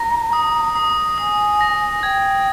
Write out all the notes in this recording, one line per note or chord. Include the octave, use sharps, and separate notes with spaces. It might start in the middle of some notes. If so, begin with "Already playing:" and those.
Already playing: A#5 A#6
D#6
D#6
G#5 D#6
A#6
G5 G#6